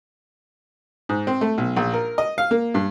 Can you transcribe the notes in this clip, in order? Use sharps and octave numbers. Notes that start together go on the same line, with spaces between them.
G#2
C4
A3
B1
A#1
A#4
D#5
F5
A#3
G2